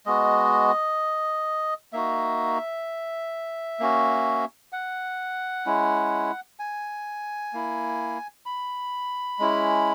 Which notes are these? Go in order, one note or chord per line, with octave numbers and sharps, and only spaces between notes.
G#3 B3 F#4 D#5
A#3 D#4 F#4 E5
A#3 C#4 F#4
F#5
G#3 C#4 E4
G#5
A#3 E4
B5
G#3 C#4 E4